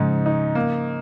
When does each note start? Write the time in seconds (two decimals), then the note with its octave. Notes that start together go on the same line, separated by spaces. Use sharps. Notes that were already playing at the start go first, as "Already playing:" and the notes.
Already playing: G#2 C#3 F3 D#4
0.26 D#4
0.55 A#3